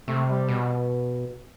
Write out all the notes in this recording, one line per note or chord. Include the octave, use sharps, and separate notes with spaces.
C3 A3
G3
B2